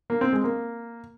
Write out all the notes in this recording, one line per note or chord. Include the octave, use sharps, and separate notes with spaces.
A#3
C4
G#3
A#3